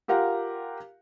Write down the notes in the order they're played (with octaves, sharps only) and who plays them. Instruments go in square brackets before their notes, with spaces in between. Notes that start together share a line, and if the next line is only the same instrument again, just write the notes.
[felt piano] F4 G4 A#4 F5 F#5